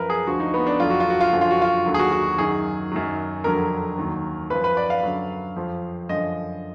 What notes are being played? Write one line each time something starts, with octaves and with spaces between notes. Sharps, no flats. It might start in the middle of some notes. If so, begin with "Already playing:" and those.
Already playing: F#2 F3 A#4 B4
G#4
D2 D3 F3 F#4
D#4
B3
D4
F2 D3 F#3 F4
F#4
F4
F#4
F4
F#2 D3 F3 F#4
F4
F#4
F4
D#2 D3 F#3
G#4
F#4
F#4
F#2 D#3 F#3 G#4
F#2 D#3 F#3
F2 D3 F#3 A#4
D#2 D#3 F#3
F#2 F3 B4
B4
D5
F5
F#2 D3 F#3
F2 F3
F#2 D3 F3 D#5